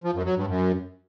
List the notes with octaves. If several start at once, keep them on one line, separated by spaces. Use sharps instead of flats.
F3
F#2
F#3
G2
F#2